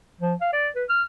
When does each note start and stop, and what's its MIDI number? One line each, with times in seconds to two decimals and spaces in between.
0.21 0.35 53
0.41 0.48 77
0.53 0.68 74
0.76 0.84 71
0.89 1.03 89